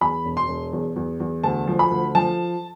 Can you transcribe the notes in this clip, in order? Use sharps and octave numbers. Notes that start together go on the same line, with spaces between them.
E2 B5
E1
C6
E1
E2
E2
E2
D2 A5
F3
B5
D2
F3 A5